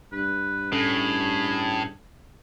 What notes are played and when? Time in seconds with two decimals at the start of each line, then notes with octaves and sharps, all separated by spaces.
0.13 G2 B4
0.72 A2 C#4 G#4 A4